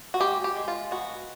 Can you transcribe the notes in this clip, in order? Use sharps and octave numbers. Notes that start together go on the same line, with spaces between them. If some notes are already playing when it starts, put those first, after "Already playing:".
F#4
G#3 G4
G4
G#3
F4
B3 F#4